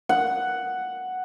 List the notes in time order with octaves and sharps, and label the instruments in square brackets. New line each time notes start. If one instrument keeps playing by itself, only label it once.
[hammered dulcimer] F#5